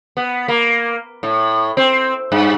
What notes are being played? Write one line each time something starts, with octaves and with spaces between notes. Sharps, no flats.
B3
A#3
A2
C4
G2